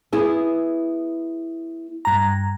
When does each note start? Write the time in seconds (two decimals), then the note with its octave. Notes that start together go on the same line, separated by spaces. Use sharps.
0.12 B3 E4 G#4
2.05 G2 A#5